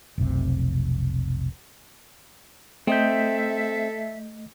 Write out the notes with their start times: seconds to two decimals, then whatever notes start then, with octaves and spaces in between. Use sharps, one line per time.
0.18 F1 B1 C3
2.87 A3 C4 A4 D#5 E5 G6